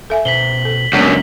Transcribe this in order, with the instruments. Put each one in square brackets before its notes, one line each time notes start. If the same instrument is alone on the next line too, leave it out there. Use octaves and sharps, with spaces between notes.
[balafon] A4 E5 G#5
[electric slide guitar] B2 C5 [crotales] B6 F#7 G7
[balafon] A4
[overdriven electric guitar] C#2 F#2 [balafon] G#3 B3 [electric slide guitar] A#3 D4 [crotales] B6